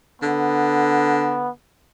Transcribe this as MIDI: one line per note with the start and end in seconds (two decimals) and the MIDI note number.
0.22 1.53 50
0.22 1.49 59